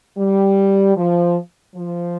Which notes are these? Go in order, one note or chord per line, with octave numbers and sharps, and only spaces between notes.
G3
F3
F3